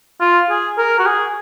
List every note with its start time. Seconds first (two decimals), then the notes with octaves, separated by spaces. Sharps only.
0.20 F4
0.50 G#4
0.78 A#4
0.99 F#4
1.06 G#4